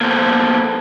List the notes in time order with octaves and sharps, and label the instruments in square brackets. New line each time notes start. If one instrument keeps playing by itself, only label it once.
[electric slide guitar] A#3 B3 A4 C5